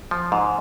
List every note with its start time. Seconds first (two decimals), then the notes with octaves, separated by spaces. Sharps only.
0.11 F3
0.32 G#2